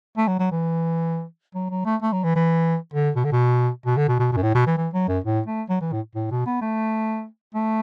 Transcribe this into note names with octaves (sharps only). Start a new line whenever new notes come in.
A3
F#3
F#3
E3
F#3
F#3
A3
A3
F#3
E3
E3
D3
B2
D3
B2
B2
D3
B2
B2
B2
F#2
A2
B2
E3
E3
F#3
F#2
A2
A3
F#3
E3
A2
A2
B2
B3
A3
A3